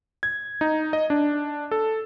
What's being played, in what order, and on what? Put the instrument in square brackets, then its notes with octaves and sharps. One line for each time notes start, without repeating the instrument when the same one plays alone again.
[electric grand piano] G#6
D#4
D#5
D4
A4